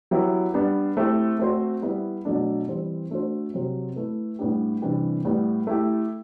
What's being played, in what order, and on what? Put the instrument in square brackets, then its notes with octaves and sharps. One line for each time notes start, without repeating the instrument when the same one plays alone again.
[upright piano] F#3 B3 E4 G4
G3 B3 D4
A3 C4 E4 G4
A3 C4 F#4 C5
G3 B3 E4 B4
B2 F#3 A3 D4
E3 G3 C4
A3 D4 F#4 C5
C3 F#3 C4 F#4
A3 E4 B4
A2 G3 B3 D4 G4
C3 E3 G3 D4 G4
A2 G3 B3
A3 E4 G4